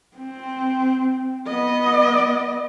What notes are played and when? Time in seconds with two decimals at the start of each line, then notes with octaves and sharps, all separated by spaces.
0.16 C4
1.47 B3 D#5